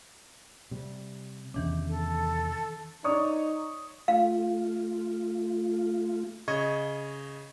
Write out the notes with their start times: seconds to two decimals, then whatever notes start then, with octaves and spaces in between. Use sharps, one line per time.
0.71 C3 G3
1.54 E2 C3 D#3 E3 C#4 D4
1.88 A4
3.04 D#4 C#5 D5 D#6
4.08 A3 F4 F5
6.48 C#3 D#5 C#6 G#6